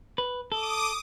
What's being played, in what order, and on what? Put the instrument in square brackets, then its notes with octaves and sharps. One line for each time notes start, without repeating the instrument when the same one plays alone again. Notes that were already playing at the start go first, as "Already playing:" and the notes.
[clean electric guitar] B4
[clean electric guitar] A4 [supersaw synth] D6 D#6